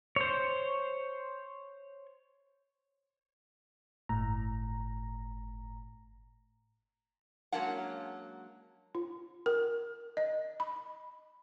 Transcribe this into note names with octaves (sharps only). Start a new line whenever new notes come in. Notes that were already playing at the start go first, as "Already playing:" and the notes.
C5 C#5
G1 A2 A#5
F#3 G#3 A#3 C#4 D4 F#5
F4
A#4
D#5
B5